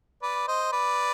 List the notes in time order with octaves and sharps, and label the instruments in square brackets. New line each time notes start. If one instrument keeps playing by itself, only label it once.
[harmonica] B4 D5
C5 D#5
B4 D5